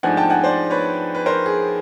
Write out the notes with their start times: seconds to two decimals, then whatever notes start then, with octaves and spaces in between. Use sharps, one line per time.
0.03 G#2 F3 A3 D4 F#5 G#5
0.17 G5 A5
0.30 F#5 G#5
0.44 C5 D5
0.71 B4 C#5
1.15 B4
1.26 A#4 C5
1.46 G#4